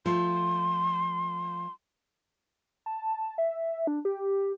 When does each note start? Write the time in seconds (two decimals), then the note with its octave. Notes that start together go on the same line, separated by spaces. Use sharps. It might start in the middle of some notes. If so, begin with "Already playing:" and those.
0.06 F3 A3 C6
2.86 A5
3.38 E5
3.87 D4
4.05 G4